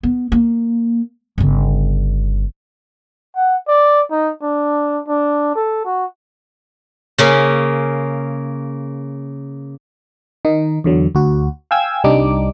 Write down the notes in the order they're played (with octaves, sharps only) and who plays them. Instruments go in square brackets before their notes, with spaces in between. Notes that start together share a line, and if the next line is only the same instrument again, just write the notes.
[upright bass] B3
A#3
G1 C#3
[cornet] F#5
D5
D#4
D4
D4
A4
F#4
[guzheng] C#3 A#3 C#4
[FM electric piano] D#3 D#4
E2 D3 F#3
D2 F#4
F5 G5 G#5 E6 G#6
C2 G3 D4 D#4 D6